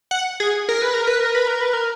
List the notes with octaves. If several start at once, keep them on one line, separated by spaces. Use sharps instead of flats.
F#5
G#4
A#4
B4
A#4
B4
A#4
B4
A#4
B4
A#4